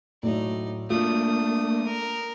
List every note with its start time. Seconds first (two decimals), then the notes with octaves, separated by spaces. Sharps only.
0.23 A2 F#3 A3 D#4 D5
0.90 A3 A#3 D4 F4 D#6
1.86 A#4